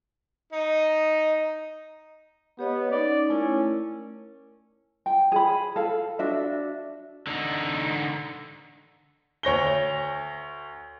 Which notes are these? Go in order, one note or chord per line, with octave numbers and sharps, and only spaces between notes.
D#4
B3 G4 C#5 D#5
C#4 D#4 D5
A3 C#4 E4 A#4
G5
G#4 B5
A4 F5
D4 F#4 E5
D3 D#4
D2 C#5 A#6 G7